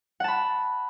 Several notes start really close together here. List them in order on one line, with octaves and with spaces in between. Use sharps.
F#5 A5 B5